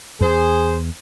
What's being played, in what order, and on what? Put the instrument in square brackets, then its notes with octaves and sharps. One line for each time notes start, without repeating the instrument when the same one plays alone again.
[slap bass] E2 [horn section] G#4 C5